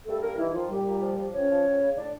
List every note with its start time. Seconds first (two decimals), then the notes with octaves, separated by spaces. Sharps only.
0.06 G2 A3 A4
0.22 G2 A#3 A#4
0.38 D#3 E3 E4
0.53 D#3 F3 F4
0.70 A#2 G3 G4
0.86 A#2
1.02 F3
1.17 F3
1.33 F2 C#4 C#5
1.49 F3
1.65 F2
1.80 C#3
1.96 A2 D4 D5